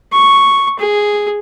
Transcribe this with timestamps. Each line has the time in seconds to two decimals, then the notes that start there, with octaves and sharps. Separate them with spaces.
0.12 C#6
0.79 G#4